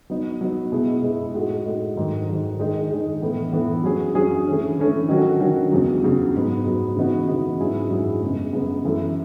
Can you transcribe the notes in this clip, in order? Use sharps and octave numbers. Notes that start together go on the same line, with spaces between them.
F#3 B3 D#4
F#3 B3 D#4
B2 G#3 B3 E4 G#4
B2 G#3 B3 E4 G#4
A2 G#3 D#4 F#4
A2 G#3 D#4 F#4
G#2 D#3 F#3
G#2 D#3 F#3
D#3 G#3 D#4 G#4
D#3 G#3 D#4 G#4
A2 E3 B3
A2 E3 B3
F#3 C#4 G#4
F#3 C#4 G#4
E3 A3 C#4
E3 A3 C#4
D#3 F#3 C#4 F#4
D#3 F#3 C#4 F#4
E2 C#3 F#3
E2 C#3 F#3
G#2 F#3 B3
G#2 F#3 B3
C#3 E3 B3 D#4 F#4
C#3 E3 B3 D#4 F#4
G#2 F#3 C#4 E4 G#4
G#2 F#3 C#4 E4 G#4
F#2 C#3 G#3 B3
F#2 C#3 G#3 B3
F#2 E3 A3 E4